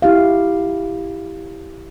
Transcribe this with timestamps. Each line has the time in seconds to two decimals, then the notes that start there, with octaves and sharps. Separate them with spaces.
0.02 E4 G4 F5